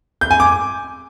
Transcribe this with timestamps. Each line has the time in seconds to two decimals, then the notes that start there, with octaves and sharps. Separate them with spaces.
0.21 G6
0.31 G#5
0.40 D6